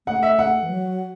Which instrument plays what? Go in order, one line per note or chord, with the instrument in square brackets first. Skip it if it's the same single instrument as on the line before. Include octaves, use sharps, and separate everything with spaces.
[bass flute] A3 [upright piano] F#5
[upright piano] E5
F#5
[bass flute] E3
F#3